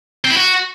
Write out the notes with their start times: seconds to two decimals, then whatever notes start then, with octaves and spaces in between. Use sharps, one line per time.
0.25 C4
0.31 E4
0.37 F#4